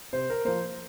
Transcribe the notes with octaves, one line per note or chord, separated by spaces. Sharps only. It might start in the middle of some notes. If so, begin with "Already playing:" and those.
C3 C5
A#4
F3 A#3 C5